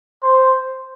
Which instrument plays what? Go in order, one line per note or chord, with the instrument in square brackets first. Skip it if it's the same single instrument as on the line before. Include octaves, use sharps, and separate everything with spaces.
[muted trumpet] C5